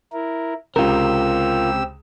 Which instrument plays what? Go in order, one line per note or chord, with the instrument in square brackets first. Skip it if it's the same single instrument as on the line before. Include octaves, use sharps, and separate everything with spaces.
[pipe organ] E4 A#4
[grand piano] C#2 C3 [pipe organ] C4 G4 E6 [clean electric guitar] F4 A#4